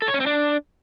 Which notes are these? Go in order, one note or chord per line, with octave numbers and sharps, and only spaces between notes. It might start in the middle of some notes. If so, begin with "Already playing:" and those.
A4
C#5
C#4
C4
D4